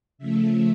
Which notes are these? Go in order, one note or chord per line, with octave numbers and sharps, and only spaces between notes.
C#3 F3 A3 E5